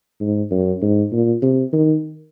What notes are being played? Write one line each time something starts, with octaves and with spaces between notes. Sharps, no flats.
G#2
F#2
G#2
A#2
C3
D#3